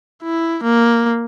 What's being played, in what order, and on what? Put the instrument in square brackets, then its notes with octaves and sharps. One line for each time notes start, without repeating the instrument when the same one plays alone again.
[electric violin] E4
A#3